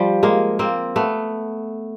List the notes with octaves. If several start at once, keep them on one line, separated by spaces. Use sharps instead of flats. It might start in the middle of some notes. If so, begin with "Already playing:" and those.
Already playing: F3 G3
G#3 A#3
A#3 C4
A3 B3